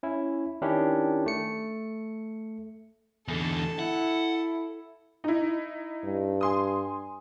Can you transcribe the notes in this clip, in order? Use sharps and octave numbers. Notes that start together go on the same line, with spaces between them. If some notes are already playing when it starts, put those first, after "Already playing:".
C#4 E4
D#3 C#4 D4 E4 G4
A3 C#7
E2 D3 A4
E4 F#5
D#4 E4
G2
G#5 C6 D#6